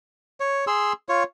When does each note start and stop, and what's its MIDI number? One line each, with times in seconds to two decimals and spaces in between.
0.40 0.65 73
0.67 0.93 68
0.67 0.93 84
0.67 0.93 88
1.09 1.23 65
1.09 1.23 73